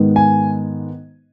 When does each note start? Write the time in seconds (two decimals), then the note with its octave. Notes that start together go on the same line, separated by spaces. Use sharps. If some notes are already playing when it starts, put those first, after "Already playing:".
Already playing: G#2 D#3 G#3 B3
0.16 G#5